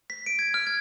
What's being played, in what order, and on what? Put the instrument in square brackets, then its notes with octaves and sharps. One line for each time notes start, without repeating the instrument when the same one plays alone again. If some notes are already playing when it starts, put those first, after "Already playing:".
[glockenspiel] B6
D7
G#6
F6
G#6